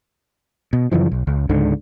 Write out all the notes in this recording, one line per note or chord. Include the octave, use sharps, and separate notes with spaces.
B2
F#2 C#3 E3 F3
B1
C#2
C#2 G#2 D3